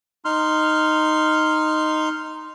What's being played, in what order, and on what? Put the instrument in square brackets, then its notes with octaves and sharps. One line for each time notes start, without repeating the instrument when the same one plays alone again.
[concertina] D#4 C6 F6